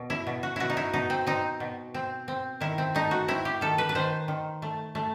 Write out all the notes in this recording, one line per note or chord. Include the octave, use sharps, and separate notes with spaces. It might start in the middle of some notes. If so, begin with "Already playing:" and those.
Already playing: B2
E4
B2
F#4
B2 E4 F#4
D#4
E4
B2 D#4
C4
C4 D#4
B2
C4
C4
D#3 E4
C4
A3 D#4
F#4
C4 E4
G4
D#3 A4
B4
B4
D#3 C5
D#3
A3
A3